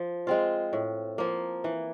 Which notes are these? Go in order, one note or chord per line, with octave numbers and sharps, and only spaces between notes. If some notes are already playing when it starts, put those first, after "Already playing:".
Already playing: F3
G#3 C4 F4
A2
F3 A#3
E3